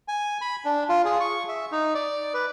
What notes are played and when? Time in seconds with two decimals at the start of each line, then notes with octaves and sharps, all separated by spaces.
0.08 G#5
0.41 B5
0.65 D4
0.89 F4
1.05 G#4
1.20 C#6
1.49 E5
1.72 D#4
1.95 D5
2.34 B4